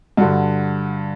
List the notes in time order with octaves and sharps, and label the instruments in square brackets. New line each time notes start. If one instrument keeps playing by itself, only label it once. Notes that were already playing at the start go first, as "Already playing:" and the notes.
[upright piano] G2 D3 F#4